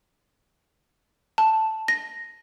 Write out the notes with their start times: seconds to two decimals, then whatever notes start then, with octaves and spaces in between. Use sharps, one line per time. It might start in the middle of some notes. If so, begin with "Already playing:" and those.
1.38 A5
1.88 A#6